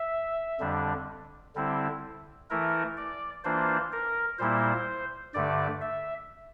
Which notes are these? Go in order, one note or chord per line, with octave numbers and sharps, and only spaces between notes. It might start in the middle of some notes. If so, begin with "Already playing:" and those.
Already playing: E5
F2 D3 G3 D4
D3 G3 C4 E4
E3 A3 E4 A#4
D5
E3 A#3 D4 F4 C5
A#4
A#2 G3 A#3 E4 C5
G2 D3 A3 D5
E5